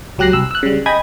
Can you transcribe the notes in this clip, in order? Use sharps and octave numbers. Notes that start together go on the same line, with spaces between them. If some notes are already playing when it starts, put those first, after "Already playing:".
C#2 F#3 G4 F#6 A#6 C7
C2 E6
E6 F#6
C#3 G3
D#5 G5 G#5 B5 D#6 G#6